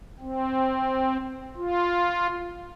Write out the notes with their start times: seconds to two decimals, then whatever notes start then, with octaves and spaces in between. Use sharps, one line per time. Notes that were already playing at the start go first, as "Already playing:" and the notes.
0.20 C4
1.57 F4